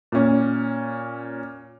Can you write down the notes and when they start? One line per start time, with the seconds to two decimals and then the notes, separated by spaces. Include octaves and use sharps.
0.12 A#2 C#4